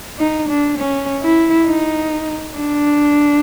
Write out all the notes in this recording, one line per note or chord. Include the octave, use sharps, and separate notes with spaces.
D#4
D4
C#4
E4
D#4
D4